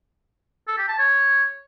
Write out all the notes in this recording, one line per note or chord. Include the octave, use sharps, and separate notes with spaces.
A4
G4
A5
C#5